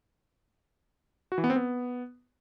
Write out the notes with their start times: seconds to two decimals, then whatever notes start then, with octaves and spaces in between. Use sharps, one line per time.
1.32 F#4
1.38 E3
1.44 B3
1.50 C4
1.56 B3